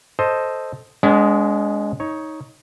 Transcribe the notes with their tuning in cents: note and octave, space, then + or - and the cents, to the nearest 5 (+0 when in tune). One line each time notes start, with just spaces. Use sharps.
A4 +0 C5 +0 D#5 +0
G#3 +0 B3 +30 D4 -45
D#4 +15 C#5 +0